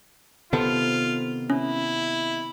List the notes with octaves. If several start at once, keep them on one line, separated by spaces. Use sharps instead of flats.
C3 D#3 B3 F4 A4 C5
C#4 E4